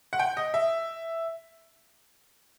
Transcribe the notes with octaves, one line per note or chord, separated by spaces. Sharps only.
F#5
G5
D#5
E5